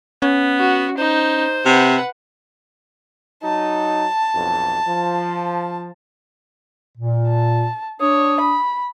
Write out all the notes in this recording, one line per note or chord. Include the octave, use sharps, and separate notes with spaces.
B3 C#4
F#4
D#4 C5
C3 B4 F#5
F#3 D#4 A5
B1 F2
F3
A#2
A5
D4 C#5 D#6
B5